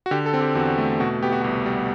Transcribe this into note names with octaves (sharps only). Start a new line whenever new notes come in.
F#4
D3 G4
A4
C4
G4
E2 F#4
A3
B2 F#4
B3 G4
F#4
C2 G4
G3